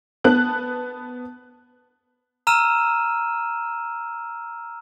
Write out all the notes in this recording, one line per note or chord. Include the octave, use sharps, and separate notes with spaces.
B3 A5 F#6
A#5 E6 F6 D#7 E7